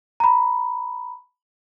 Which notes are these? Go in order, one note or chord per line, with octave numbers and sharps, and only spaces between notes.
A#5 B5